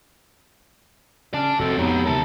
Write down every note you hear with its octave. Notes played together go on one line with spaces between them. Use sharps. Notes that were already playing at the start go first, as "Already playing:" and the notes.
C#3 C#4 D5 A5
F1 C4 F#4 A4
F2 G#3 B3 D#4 G4 C#5
D2 C3 D#3 G#3 A#4 A5